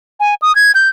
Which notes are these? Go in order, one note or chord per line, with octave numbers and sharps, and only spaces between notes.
G#5
D#6
G#6
G6